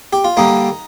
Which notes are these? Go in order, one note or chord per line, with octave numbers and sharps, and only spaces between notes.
G4
F4
D3 G3 A#3 D#4